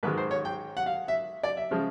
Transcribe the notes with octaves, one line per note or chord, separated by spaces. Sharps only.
G#2 D#3 G#3 B4
C5
C#5
G5
F#5
F5
E5
D5
E5
C#3 F3 G#3